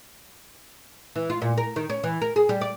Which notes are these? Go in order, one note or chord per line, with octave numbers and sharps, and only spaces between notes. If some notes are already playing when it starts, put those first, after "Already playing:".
E3
F4
A#2
A#4
D#3
C#4
E3
A#4
G#4
G3
D5